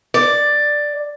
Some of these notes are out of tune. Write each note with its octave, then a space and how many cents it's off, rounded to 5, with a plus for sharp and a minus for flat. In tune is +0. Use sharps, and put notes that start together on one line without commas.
D5 +5